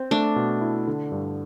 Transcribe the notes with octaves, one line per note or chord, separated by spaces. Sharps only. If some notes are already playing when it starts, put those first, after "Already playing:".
Already playing: C4
A3 D4
B2
E4
D3
G2